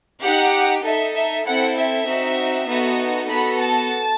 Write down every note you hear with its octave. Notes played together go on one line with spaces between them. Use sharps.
D#4 G4 F#5
D#4 A4 E5
E5
C4 E4 A4 F#5
E5
C4 D#4 F#4
B3 D#4 F#4 A4
B3 F#4 A4 B5
A5